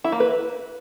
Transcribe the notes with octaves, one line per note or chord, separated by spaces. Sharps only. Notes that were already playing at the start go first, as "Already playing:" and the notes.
E4
A#3
B4